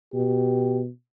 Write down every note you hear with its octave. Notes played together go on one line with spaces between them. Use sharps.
B2 G4